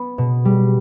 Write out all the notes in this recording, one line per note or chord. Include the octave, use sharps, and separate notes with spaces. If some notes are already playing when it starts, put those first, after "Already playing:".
Already playing: B3
B2
G3